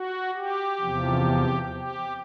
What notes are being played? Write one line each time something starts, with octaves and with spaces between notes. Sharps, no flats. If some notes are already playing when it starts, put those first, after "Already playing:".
Already playing: F#4
G4
E2 C3 F3
G4